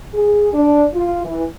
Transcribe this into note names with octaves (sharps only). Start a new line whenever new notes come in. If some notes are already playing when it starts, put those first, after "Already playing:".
G#4
D4
F4
E3